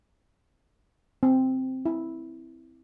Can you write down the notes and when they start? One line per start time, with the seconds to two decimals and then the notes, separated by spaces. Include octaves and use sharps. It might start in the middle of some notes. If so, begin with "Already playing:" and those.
1.23 C4
1.86 E4